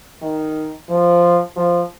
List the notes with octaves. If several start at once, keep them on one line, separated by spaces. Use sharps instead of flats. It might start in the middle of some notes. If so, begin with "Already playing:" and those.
D#3
F3
F3